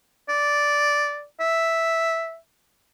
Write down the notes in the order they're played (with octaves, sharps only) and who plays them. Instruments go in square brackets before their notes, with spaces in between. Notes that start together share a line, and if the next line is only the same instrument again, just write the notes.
[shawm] D5
E5